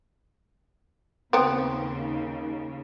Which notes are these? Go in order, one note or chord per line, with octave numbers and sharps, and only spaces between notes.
D#2 C#3 B3 C4